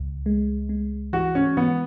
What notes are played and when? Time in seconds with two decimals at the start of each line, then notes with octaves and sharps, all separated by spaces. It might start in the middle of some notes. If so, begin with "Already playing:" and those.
Already playing: C#2
0.26 G#3
0.69 G#3
1.13 E3 F#4
1.35 C#4
1.57 E3 B3